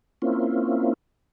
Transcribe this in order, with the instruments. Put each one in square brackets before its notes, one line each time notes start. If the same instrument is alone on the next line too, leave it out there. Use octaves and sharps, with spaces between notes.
[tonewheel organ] A#3 C4 C#4 E4 F4